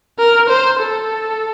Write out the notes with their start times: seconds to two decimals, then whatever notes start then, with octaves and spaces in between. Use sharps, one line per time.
0.19 A#4
0.49 C5
0.79 A4